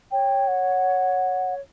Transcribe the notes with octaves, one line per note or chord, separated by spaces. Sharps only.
C#5 G5
F#5